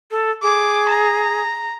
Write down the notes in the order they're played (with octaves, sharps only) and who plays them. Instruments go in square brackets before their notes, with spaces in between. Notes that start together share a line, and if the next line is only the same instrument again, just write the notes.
[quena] A4
[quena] G#4 [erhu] D6
[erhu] A#5